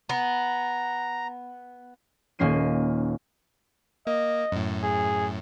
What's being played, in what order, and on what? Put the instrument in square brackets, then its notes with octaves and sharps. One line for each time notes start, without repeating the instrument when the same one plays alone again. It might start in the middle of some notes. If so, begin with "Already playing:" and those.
[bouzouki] B3 [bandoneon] A#5
[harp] D#1 A#3 C#4 C7 D#7
[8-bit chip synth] A#3 [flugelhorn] D#5
[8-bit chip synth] F#2 A2
[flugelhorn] G#4